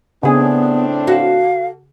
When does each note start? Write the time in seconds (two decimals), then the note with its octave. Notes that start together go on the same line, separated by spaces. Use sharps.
0.23 A2 C#3 B3 C4 D4 G#4
1.07 F#4 A4 F5